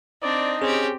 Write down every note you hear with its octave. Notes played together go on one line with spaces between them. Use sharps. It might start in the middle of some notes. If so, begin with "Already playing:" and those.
C4 D4 D#4 D5
C4 C#4 G4 G#4